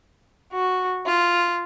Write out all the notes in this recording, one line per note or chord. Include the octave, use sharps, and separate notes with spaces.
F#4
F4